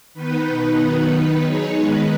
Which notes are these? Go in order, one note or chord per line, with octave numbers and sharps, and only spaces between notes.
D#3 B3 D#4 B4
B2 B3 D#4
D#3 F#3 B3 D#4 B4
D#3 B3 D#4
F#3 D#4 G#4 C#5
D#3 G#3 B3 D#4 B4